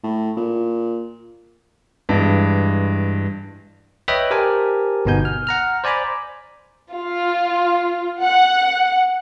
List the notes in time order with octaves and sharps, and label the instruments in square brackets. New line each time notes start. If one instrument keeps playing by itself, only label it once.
[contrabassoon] A2
A#2
[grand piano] G2 E3 G#3
[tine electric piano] B4 C#5 D#5 E5 G5 B5
G4 A#4 C5 G#5 A5
G1 B2 B3 D#4 G#5 G6
F6
F#5 A#5 F6
C5 D5 G#5 A#5 B5 D6
[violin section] F4
F#5